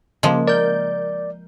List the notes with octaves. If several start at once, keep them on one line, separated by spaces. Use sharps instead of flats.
C#3 F3 G#3 A#3
A#4 D5 G6